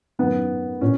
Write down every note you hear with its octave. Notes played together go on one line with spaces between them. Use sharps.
F#2 D#3 B3
A#2 C#4